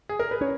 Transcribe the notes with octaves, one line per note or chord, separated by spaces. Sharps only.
G#4
A#4
B4
C#4 C#5